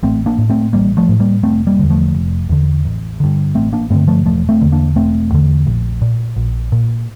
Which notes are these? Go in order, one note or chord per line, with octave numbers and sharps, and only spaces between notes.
A1 A3 C4
A#3 D4
A2
A3 C4
A1 G3 A#3
F3 A3
A2
G3 A#3
F1 A3 C4
G3 A#3
E2 D3
F3 A3
F1
E2 D3
A1
G2 D3
A1 A3 C4
A#3 D4
G2 D3 A3 C4
F3 A3
E1 F3 A3
A3 C4
E2 D3
A#3 D4
E1 A3 C4
E2 D3
A#1
A#2
A#1
A#2